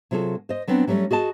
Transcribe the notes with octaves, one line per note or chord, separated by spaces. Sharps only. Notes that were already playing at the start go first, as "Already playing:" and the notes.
C3 F#3 F4 G#4 A4
C5 D#5
F#3 B3 C4 D4
F#3 G3 A3 C#4
F#4 G#4 D#5 A5